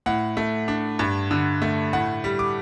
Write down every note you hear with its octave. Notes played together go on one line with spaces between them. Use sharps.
A2 F#5
A3
D4
G2
D3
A3
A2 F#5
G3
D6